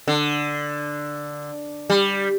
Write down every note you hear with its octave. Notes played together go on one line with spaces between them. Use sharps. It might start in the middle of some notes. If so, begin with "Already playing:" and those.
D3
G3